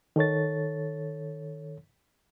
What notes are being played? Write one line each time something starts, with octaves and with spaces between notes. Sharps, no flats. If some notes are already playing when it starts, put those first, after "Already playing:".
D#3 A4 C#5 A6